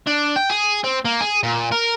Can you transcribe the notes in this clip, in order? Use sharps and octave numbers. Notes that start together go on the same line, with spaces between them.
D4
G5
G#4
C4
A#3
G#4
A#2
A#4